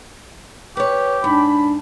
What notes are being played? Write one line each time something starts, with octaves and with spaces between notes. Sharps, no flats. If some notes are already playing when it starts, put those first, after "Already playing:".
G4 B4 C#5
G#2 D4 B5